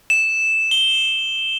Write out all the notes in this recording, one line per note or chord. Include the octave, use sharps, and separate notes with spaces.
E7
G7